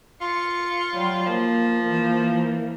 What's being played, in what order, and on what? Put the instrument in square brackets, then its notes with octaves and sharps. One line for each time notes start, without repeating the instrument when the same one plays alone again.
[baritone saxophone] F4 [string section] C#7
[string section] F#3 G3
[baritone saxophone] F3 [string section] A#3
[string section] E3 A#3